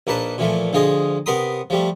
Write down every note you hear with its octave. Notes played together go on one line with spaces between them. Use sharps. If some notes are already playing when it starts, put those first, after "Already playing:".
A#1 A#3 D#4 B4 A5
A#2 E3 F3 A3
D2 F3 F4 G#4 D#5
C3 B3 A#4 B5 C6 D#6
F3 G3 A3